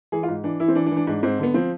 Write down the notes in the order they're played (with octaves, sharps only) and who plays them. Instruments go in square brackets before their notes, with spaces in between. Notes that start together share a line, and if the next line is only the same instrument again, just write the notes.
[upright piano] E3 G#4
F4
G#2
E3 D4
E3 E4
C4
E3 D4
D4
E3
D4
G#2 D4
G#2 C4
D3 B3
F3 C4